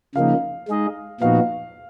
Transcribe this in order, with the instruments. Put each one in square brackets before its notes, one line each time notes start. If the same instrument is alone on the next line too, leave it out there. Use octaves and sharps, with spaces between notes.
[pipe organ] C#3 F3 A#3 D#4 [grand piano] F5
[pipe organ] G#3 D#4 G#4 D#5
[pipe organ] A#2 F3 B3 D#4 F#4 [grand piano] F5